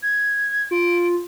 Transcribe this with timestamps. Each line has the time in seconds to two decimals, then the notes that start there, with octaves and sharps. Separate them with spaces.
0.02 G#6
0.71 F4 D7